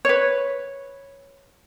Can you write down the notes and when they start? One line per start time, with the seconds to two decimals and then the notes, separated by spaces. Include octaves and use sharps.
0.05 B4 C#5